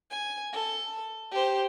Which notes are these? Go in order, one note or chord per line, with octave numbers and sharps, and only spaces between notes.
G#5
A4
G4 C5